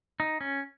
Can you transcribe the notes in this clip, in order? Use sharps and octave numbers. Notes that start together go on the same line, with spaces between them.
D#4
C#4